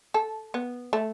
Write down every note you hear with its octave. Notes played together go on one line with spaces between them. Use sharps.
A4
B3
A3